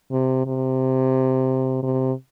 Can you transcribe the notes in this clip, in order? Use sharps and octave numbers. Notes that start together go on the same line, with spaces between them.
C3
C3
C3